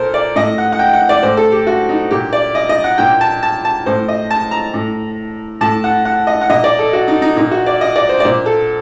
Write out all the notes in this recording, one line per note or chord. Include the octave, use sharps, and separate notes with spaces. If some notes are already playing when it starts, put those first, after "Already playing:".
Already playing: A#2 A4 A#4 C5
D5
A2 D#5
F#5
F#5
G5
F#5
D5
A2 C5
A4
G4
F#4
D#4
A#2 G4
D5
D#5
D#5
F#5
A#2 G5
A5
A5
A5
A2 C5
D#5
A5
A#5
A2
A2 A5
F#5
F#5
D#5
F#5
A#2 D#5
D5
A4
F#4
D#4
D#4
A#2 D#4
F#4
D5
D#5
D5
C5
D5
A#2 C5
A4